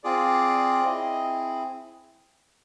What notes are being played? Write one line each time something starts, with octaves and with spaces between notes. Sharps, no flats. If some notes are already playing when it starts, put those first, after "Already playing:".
C4 F4 G#4 D5
C4 E4 G#4 D#5